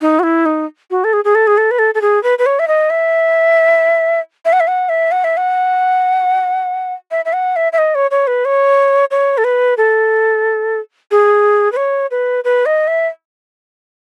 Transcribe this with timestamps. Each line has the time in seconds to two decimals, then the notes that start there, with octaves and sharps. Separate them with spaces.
0.01 D#4
0.19 F#4
0.23 E4
0.45 D#4
0.91 F#4
1.04 A4
1.13 G#4
1.24 G#4
1.35 A4
1.47 G#4
1.57 A4
1.71 B4
1.79 A4
1.95 A4
2.01 G#4
2.23 B4
2.39 B4
2.46 C#5
2.59 E5
2.68 D#5
2.90 E5
4.45 E5
4.53 F#5
4.60 E5
4.67 F#5
4.89 E5
5.12 F#5
5.24 E5
5.37 F#5
7.11 E5
7.25 E5
7.33 F#5
7.56 E5
7.73 E5
7.78 D#5
7.95 C#5
8.11 C#5
8.27 B4
8.45 C#5
9.11 C#5
9.38 A4
9.44 B4
9.77 A4
11.11 G#4
11.72 B4
11.76 C#5
12.11 B4
12.44 B4
12.66 D#5
12.87 E5